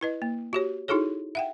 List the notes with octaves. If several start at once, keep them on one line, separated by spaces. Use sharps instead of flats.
E4 B4 D#5
A#3
F#4 G4 C#5
D#4 E4 F#4 G#4 A4 C#5
E5 F#5 G5